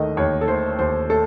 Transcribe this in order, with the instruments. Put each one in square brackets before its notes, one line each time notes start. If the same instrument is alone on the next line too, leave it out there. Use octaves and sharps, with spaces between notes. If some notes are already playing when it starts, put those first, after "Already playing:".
Already playing: [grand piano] D#2 D#3 A3 D#5
D#2 C#5
A4
D#3 A3 C5
D#2 C5
A3 A4